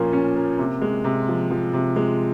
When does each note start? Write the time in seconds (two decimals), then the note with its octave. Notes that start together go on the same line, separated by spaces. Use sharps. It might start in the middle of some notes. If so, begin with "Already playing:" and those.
Already playing: A#2 F3 A#3 C#4
0.13 C#4
0.36 A#3
0.58 C3
0.82 G#3
1.04 C3
1.28 F3
1.51 F3
1.73 C3
1.96 G#3